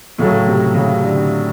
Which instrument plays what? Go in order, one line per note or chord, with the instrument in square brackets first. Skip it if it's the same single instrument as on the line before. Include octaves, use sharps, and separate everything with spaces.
[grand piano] A2 F#3 A3 [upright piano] C#3
[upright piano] C3
C#3
D3